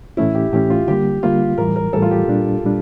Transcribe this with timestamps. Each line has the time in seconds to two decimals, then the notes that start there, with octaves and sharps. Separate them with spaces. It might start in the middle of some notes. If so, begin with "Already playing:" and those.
0.17 A2 E3 A3 C#4 E4
0.35 G4
0.53 A2 E3 A3 C#4 G4
0.70 F4
0.88 D3 G3 A#3 G4
1.23 D3 G3 A#3 F4
1.58 A2 E3 G3 A#4
1.76 A#4
1.93 A2 E3 G3 A4
2.02 F4
2.11 G4
2.28 A#2 G3 D4
2.64 A#2 G3 D4